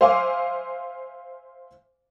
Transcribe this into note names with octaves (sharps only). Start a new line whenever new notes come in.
C5 E5 F5 G#5 D6